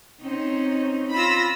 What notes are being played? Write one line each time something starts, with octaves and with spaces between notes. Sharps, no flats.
C4 C#4 D#4
F4 B5 E6 A#6